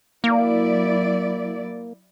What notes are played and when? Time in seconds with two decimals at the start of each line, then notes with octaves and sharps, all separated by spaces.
0.24 F#3 A#3 E4 D5